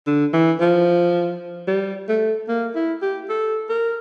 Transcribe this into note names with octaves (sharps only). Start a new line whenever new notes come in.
D3
E3
F3
G3
A3
A#3
E4
G4
A4
A#4